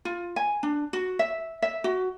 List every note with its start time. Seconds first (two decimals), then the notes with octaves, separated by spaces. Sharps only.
0.05 F4
0.36 G#5
0.63 D4
0.93 F#4
1.19 E5
1.62 E5
1.84 F#4